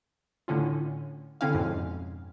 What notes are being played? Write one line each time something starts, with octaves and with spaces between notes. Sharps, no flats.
A2 D3 C#4 F4
D3 C4 C#4 E4 F5
F2 G#2 B2